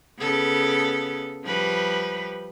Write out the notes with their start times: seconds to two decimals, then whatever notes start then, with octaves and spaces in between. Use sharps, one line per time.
0.19 C#3 B3 A4
1.45 F3 G3 B4